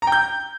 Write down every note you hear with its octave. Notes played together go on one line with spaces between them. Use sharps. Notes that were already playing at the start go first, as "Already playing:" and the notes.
A#5
G5
G6